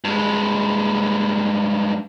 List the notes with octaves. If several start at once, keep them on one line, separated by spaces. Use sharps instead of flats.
G2 G#3